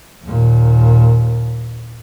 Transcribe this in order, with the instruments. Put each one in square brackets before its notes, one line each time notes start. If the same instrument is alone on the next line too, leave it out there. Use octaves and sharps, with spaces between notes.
[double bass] D#2 A#2